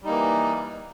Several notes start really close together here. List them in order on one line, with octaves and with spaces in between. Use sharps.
G3 D#4 A#3 E3